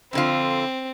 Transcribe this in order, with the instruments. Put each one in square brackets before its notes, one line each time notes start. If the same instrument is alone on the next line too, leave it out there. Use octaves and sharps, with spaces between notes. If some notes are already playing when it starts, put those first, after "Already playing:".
[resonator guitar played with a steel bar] F2 D3 F4 [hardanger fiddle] C4